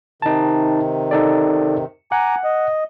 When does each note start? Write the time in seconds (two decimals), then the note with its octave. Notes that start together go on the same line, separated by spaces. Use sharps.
0.22 C3 D#3 D#4 A5
1.11 D#4 A4 D5
2.12 F#5 G#5 A#5 D6
2.44 D#5